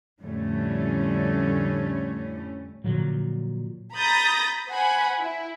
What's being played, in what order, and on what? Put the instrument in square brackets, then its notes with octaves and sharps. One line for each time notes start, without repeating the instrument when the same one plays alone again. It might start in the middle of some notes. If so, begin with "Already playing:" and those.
[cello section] F2 A2 D3 G3 A3 C#4
[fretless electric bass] A#2 D3 F3 F#3
[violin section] A#5 B5 D#6 G6 A6 A#6
C5 F#5 G#5 B5
E4